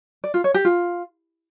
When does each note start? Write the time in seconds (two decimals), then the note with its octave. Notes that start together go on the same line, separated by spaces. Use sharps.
0.24 D5
0.34 F4
0.44 C#5
0.54 G4
0.65 F4